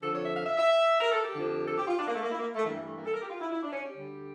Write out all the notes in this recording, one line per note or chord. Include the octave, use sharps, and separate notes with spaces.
F2 D3 F3 A4
C#5
E5
F5
E5
E5
A#4
A4
G4
F2 D3 F3
A4
G4
F4
D4
A#3
A3
A#3
E4
A#3
A3
G2 E3 G3 A#3
A3
A#3
A4
A#4
G4
F4
E4
E4
D4
C#4
G4
D2 D3 G3